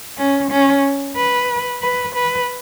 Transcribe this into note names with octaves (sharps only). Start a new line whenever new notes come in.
C#4
C#4
B4
B4
B4